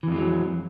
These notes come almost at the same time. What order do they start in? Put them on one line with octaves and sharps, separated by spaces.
E3 F2 G#3 F#3